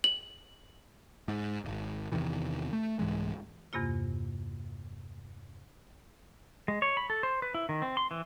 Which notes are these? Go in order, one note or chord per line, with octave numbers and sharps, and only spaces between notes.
F#7
G#2
D1 G#1
E2 C3 D#3 E3
A3
C2 G#2 E3 G#3
E2 G2 C3 A#3 F4
G#3
C#5
B5
A4
C5
B4
E4
D#3
C4
C6
E3